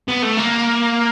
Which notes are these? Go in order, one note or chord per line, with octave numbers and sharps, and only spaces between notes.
B3
A3
A#3